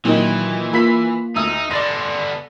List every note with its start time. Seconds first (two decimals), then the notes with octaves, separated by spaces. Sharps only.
0.05 A#2 D#3 E3 F#3 D#4
0.73 A#3 F4 B5 B6
1.36 D2 D#4 E6
1.71 D3 B3 D5 C6 A6 A#6